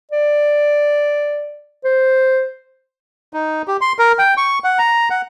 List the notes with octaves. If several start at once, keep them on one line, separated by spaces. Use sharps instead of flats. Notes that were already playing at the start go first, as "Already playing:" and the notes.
D5
C5
D#4
G4
C6
A#4
G5
C#6
F#5
A#5
F#5